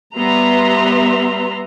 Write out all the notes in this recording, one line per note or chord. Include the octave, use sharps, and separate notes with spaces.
G3 B3 B4 E5 A#5 C6